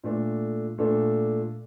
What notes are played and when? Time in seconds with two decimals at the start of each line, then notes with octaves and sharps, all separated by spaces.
0.04 A#2 A3 D4 A4
0.78 A#2 A3 D4 A4